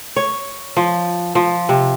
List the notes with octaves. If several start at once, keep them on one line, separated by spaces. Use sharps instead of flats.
C#5
F3
F3
C3